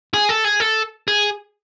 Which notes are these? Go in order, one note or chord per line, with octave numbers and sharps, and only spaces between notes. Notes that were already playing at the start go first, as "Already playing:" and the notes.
G#4
A4
G#4
A4
G#4